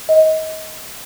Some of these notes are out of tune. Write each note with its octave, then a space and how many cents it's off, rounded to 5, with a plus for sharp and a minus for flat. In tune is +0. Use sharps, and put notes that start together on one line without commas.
D#5 +25